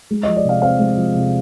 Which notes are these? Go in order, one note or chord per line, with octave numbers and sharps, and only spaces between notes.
G#3
F3 D#5
D5
C3 F5
C4 F5
G#3
F3
C3